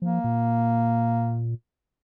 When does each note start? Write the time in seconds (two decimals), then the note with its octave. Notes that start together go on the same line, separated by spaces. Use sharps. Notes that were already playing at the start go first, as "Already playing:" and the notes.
0.02 F3 A#3
0.24 A#2